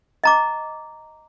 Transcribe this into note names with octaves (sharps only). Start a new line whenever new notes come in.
D#5 A#5 D6